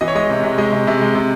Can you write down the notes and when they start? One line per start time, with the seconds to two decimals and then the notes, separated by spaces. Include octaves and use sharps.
0.01 E3 D#5
0.08 C#5
0.15 G#3 D#5
0.30 C3
0.43 C3
0.58 G#3 D#5
0.72 C3
0.87 C3
1.01 G#3
1.15 C3